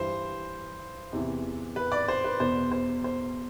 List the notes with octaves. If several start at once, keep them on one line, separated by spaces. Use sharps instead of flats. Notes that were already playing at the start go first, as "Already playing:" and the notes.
Already playing: G2 E3 C5
E2 C3 E3
B4
D5
C5
B4
E2 B2 C5
C5
C5